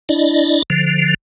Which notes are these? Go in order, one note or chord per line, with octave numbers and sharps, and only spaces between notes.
D4 E4 D5 D#5
D3 F3